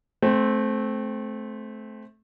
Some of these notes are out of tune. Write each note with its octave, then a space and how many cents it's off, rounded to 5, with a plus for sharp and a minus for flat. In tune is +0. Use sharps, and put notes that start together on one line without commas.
A3 -20 C4 +0